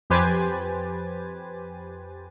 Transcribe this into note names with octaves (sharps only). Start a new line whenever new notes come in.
F2 G4 B4 C5 G#5 A6